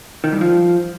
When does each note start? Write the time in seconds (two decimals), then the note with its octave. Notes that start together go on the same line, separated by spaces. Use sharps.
0.24 D#3
0.32 G2
0.41 F3